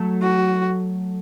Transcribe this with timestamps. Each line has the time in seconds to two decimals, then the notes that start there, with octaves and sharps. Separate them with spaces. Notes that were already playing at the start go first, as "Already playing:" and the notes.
Already playing: F#3 A3
0.22 F#4